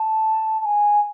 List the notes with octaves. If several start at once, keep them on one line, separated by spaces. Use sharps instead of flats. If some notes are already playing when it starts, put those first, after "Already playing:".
Already playing: A5
A5
G#5